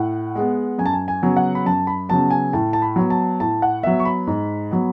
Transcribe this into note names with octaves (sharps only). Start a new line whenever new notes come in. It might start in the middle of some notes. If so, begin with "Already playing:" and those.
Already playing: A2 F#5
G#3 B3
F#2 G#5
A5
G#5
G#5
C#3 F#3 B3
F#5
B5
F#2 A5
B5
C#3 F#3 B3 A5
G#5
A2 A5
A5
B5
F#3 B3
A5
A2 A5
F#5
F#3 B3 E5
C#6
B5
G#2
F#3 B3